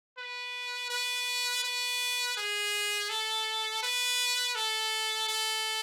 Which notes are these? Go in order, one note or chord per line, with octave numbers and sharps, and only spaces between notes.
B4
B4
B4
G#4
A4
B4
A4
A4